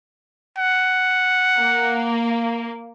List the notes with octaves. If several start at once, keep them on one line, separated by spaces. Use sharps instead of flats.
F#5
A#3